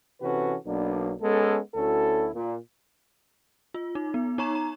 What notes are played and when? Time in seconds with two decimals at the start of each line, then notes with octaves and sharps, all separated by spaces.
0.22 C3 E3 C#4 F#4 A4 B4
0.66 B1 F#3 A#3 B3 D4
1.21 G#3 B3 C#4 A4
1.75 D2 C#4 E4 F#4 A4
2.35 A#2
3.74 F4
3.95 D#4
4.14 B3
4.38 D#4 C#5 A#5 C#6 E7
4.55 A#5